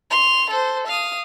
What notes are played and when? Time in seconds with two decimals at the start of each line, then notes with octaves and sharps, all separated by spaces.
0.11 C6 F7
0.50 A4 C5
0.87 F5 D#6